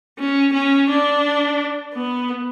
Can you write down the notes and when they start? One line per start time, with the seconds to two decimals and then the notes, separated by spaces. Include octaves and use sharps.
0.19 C#4
0.53 C#4
0.90 D4
1.94 B3